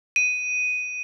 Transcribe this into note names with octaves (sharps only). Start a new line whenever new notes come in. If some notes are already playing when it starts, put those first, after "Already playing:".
D#7